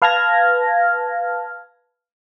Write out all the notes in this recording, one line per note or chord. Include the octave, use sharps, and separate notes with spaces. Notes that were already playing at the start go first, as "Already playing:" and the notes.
B4 F5 A5 F6 G#6 A#6